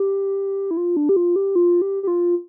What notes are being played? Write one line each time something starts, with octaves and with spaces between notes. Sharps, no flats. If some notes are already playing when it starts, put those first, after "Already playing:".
Already playing: G4
E4
F4
D4
G4
F4
G4
F4
G4
G4
F4